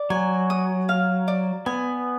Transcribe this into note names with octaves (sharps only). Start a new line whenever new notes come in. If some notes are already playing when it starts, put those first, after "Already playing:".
Already playing: D5
F#3 G#5
D#6
F5
D5
B3 G#5